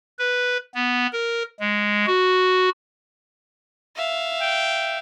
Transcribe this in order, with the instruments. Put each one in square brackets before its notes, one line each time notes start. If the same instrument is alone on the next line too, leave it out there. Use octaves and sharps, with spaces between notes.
[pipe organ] B4
B3
A#4
G#3
F#4
[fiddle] E5 F5
[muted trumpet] G5